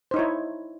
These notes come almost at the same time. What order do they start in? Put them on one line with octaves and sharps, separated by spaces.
C5 D#4 C#5 E4